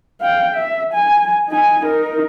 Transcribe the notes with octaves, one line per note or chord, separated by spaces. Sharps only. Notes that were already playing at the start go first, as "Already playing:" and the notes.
F5 G5
E5
G#5
D#4 G#5
D#4 A#4